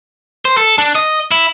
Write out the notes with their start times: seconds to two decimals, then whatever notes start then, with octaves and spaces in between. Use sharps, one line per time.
0.45 C5
0.57 A4
0.78 D4
0.95 D#5
1.31 E4